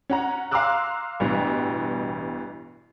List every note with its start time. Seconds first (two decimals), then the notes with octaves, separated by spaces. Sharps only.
0.10 C#4 F#5 A#5
0.51 F5 A#5 C6 D6 E6 F#6
1.20 A1 G2 B2 E3 G3